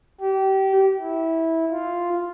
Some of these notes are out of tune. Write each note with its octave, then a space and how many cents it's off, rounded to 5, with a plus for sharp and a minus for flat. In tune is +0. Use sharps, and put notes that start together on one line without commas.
G4 -25
E4 -15
F4 +0